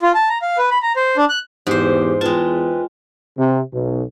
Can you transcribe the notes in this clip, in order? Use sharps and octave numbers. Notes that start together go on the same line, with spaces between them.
F4
A5
A#5
F5
B4
B5
A#5
C5
D4
F#6
E2 G#2 G4 C5
E2 G#3 F4 B4 G5 A5
C3
B1